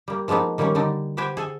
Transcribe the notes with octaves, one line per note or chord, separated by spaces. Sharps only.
G3 A#3
F3 G#3 A#3 B3 D#4
D#3 G3 A#3 C#4 C#5
D3 G3 D4 D#4
B3 G4 B4 C5 G5 G#5
G#4 A4 G#5